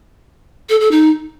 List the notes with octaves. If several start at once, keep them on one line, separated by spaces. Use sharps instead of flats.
A4
A4
D#4